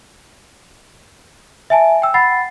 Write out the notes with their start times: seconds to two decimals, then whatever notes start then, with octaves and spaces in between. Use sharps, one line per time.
1.70 E5 G#5 A5
2.02 G5 E6
2.14 F#5 B5 A6 C7